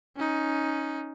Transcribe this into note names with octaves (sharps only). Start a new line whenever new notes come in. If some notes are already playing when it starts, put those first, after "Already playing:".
C#4 D#4